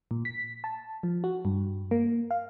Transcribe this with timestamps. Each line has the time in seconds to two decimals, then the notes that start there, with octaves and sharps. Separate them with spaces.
0.11 A#2
0.25 B6
0.64 A5
1.03 F3
1.24 F#4
1.45 G2
1.91 A#3
2.31 F5